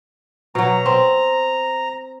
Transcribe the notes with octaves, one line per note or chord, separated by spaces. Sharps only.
B2 F#3 A#5
C4